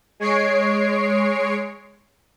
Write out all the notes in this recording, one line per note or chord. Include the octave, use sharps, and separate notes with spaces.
G#3 C#5 C7 D7